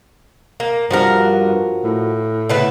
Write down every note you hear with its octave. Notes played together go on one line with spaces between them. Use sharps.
A#3
G2 F3 F#4 A#4
A2
C#3 B3 E5